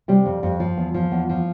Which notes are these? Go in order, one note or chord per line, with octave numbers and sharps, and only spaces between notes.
C3 G3
F2
F2
F3
E2
F3
E2
F3